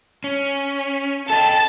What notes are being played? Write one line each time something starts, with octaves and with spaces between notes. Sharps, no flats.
C#4
A4 D#5 G5 A5